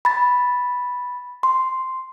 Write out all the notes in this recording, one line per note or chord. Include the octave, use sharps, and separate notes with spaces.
B5 A6
C6